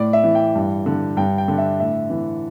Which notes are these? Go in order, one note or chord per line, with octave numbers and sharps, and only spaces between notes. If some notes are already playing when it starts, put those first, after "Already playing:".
Already playing: A2 D5
E5
E3
G5
G2
D3
G2 G5
G5
D3
E5
A2 E5
E3